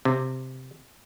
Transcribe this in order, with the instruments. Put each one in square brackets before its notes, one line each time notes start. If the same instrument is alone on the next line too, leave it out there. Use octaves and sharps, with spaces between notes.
[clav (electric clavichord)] C3